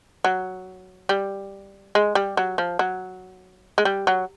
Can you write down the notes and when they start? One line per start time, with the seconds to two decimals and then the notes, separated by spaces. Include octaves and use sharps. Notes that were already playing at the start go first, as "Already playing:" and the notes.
0.24 F#3
1.09 G3
1.95 G#3
2.15 G3
2.37 F#3
2.58 F3
2.79 F#3
3.78 G#3
3.85 G3
4.07 F#3